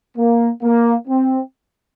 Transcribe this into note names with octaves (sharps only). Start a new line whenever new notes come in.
A#3
A#3
C4